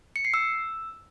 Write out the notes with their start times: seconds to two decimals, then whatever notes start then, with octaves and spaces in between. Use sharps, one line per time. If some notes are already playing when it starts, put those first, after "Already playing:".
0.16 C#7
0.25 C7
0.34 E6